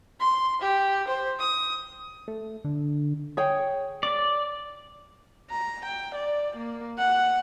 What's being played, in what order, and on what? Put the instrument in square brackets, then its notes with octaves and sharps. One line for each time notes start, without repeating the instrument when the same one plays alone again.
[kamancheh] C6
G4
C5
D#6
[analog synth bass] A3
D3
[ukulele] G#4 C#5 G5
[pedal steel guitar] D5
[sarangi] A#5
G5
D5
A#3
F#5